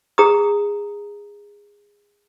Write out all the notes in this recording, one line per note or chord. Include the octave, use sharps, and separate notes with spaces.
G#4 A#5 D#6